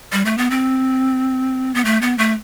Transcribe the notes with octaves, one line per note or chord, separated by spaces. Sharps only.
G3
A3
B3
C4
B3
A3
B3
A3